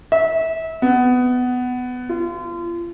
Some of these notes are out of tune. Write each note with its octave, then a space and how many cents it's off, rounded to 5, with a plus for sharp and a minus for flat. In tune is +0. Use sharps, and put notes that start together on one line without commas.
E5 -25
B3 +15
F4 -35